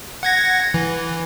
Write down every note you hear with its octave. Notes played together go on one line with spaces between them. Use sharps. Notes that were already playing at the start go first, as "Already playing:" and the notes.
F#5 G#6 A#6
E3